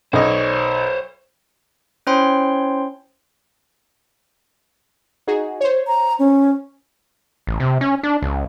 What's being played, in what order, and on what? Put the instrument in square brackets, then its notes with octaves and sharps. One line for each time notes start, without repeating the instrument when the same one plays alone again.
[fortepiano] B1 D#5 [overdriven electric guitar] C5 C#5
[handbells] C#4 E4 C5 C#5 G5 C6
[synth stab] D#4 F#4 G#4
C5 C#5
[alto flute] A#5
C#4
[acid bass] A1
C3
C#4
D4
C#2